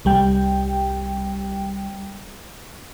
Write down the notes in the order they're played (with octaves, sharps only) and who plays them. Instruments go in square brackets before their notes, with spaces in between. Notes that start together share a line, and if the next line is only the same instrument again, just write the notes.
[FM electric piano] C2 G3 G5